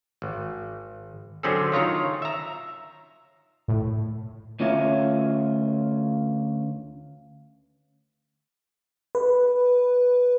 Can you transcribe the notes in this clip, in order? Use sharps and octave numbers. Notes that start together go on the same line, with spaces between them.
G#1
D3 F#3 C4 C#4 G#4 A4
D#3 F4 C#5 A#5
E5 A#5
A2
D2 C#4 F4 C#5 E5
B4